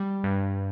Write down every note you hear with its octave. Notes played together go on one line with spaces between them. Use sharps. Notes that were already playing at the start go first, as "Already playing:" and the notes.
Already playing: G3
G2